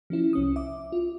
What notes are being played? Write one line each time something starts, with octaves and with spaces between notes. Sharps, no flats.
F3 C#4 E4
C2 C#4 D#6
E5 D6
F4